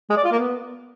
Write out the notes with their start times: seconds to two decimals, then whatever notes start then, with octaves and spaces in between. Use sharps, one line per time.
0.09 G#3
0.17 D5
0.24 F4
0.31 A#3
0.39 B3